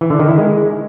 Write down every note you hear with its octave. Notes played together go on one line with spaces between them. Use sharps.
E3
D3
D#3
E4
G#3